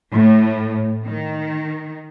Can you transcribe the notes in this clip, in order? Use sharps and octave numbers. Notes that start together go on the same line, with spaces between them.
A2
D#3